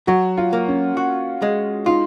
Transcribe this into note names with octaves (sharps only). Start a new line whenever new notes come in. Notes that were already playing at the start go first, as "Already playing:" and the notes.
F#3 F#4
F4
A#3
C#4
F#4
G#3
D#4 F4